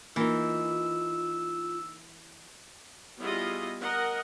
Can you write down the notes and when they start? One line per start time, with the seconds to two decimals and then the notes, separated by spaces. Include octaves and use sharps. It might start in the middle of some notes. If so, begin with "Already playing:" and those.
0.16 E3 A#3 D#4 F4 E6
3.18 G3 B3 E4 F4 G#4 D#5
3.80 A#4 D#5 F#5